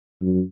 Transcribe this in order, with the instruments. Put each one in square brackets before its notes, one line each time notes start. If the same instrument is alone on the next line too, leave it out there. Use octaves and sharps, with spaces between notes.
[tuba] F#2